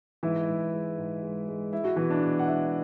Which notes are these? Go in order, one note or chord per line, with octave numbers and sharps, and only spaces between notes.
G#2 E3 E4
G#2
G#3
G#2
G#3
G#3
G#3 E4
F#4
B2 E3 E4
D4 D5
B2
F#5
G#3 E4 E5